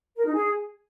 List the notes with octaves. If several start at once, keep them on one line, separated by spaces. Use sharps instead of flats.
A#4
D#4
G#4